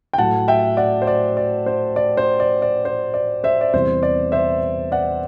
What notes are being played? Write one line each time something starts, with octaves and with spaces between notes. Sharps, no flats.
G5
A2 F#3 A3 F#5 A5
E5 G5
D5 F#5
C5
D5
D5
C5
D5
C5
D5
D5
C5
D5
C5 E5
D5
E2 C3 G3 C5
D5
C5 E5
D5 F#5